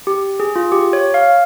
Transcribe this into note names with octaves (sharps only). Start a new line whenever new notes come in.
G4
G#4
F4
G4
C#5
F5